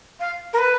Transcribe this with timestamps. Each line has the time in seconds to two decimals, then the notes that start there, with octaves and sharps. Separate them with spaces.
0.20 F5
0.53 A#4
0.58 B4